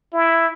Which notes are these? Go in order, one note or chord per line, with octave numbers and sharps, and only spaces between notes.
E4